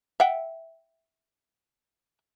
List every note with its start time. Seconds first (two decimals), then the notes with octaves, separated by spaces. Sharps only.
0.20 E5 F#5 G5